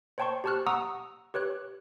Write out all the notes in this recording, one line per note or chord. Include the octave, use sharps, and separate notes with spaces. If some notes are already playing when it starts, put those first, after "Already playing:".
C5 C#5 G5 A5 C6 C#6
G4 C5 A5 C#6 F6 F#6
F#5 A#5 C#6 D#6 E6
G4 B4 C#5 F#6